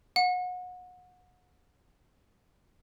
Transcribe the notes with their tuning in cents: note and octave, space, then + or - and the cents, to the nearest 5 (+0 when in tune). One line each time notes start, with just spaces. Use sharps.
F#5 -30